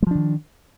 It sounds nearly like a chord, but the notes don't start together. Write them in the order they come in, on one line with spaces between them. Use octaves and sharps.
G#3 F3 D4 D#3